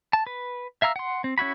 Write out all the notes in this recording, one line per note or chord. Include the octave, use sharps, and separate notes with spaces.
A5
B4
E5 F5 A#5 E6
F#5 C6
C4
C#4 E4 F#4 B5